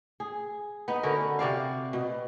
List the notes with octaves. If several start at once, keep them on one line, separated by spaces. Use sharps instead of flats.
G#4
B3 D#4
D3 C#4 F#4 A#4
C3 F#4 D5 F5
B2